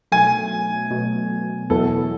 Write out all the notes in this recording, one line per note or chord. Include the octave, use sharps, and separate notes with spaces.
B2 F#3 A3 G#5
B2 F#3 A3
E2 B2 F#3 B3 E4 A4